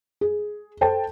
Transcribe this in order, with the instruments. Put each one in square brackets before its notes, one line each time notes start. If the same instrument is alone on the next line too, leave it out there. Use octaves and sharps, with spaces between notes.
[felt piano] G#4
A4 C5 G5 A5